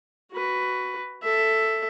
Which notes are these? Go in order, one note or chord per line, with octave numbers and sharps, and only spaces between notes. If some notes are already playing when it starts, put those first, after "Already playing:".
F#4 B4
A4 E5